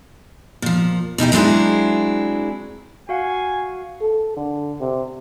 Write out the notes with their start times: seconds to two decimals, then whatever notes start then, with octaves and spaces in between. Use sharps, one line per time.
0.62 A#2 F3
1.18 B2 D#4 E4 G4
1.32 F#3 G#3 C4 D4 E4 G#4
3.09 F#4 F5 F#5 G#5
4.01 A4
4.37 D3
4.80 C3